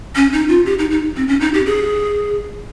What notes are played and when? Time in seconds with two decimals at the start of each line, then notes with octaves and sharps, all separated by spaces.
0.16 C#4
0.33 D#4
0.49 F4
0.66 G4
0.79 D#4
0.91 D#4
1.16 C4
1.28 C#4
1.41 D#4
1.54 G4
1.66 G#4